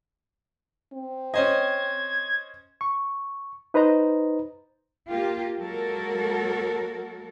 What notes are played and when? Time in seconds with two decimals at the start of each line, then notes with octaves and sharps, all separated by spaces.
0.93 C4
1.34 C#4 C5 D#5 G#6
2.81 C#6
3.74 D#4 B4 C5 D#5 A#5
5.09 A#3 F4 G4
5.58 F#3 G#3 A#3 F#4 A4 A#4